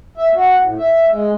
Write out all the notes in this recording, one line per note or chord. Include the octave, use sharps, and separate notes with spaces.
E5
F#4
A2
E5
G#3